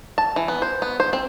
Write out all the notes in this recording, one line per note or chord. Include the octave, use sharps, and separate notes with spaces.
A5
E3
B3
C5
B3
C5
C4